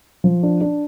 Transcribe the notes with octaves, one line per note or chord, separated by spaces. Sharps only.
F3
D4
D4